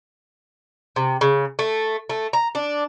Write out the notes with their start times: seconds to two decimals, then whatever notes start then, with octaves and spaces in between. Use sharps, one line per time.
0.96 C3
1.21 C#3
1.59 A3
2.09 A3
2.33 A#5
2.55 D4